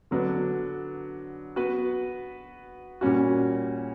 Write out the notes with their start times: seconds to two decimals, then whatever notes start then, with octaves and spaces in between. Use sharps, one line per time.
0.11 D3 F#3 B3 D4
1.56 B3 F#4 B4
3.01 A#2 G3 C#4 F#4